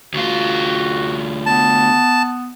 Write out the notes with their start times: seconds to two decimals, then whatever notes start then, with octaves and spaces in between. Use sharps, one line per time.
0.14 D2 F4 F#4
1.46 B3 A5